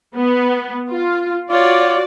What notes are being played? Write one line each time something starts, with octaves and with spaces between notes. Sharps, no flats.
B3
F4
F4 F#4 C#5 D5